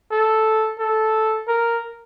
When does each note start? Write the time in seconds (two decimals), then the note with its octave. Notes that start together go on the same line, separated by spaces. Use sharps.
0.11 A4
0.79 A4
1.48 A#4